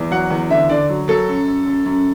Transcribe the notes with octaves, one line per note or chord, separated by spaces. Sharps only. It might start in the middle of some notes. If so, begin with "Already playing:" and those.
Already playing: E2
F#3 F#5
E2
D3 E5
D3 D5
F#3
F#3 A4
F#2
F#2
F#2
F#2